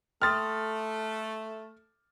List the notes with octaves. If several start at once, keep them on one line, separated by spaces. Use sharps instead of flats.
A3 G5 C6 D#6 F6 A6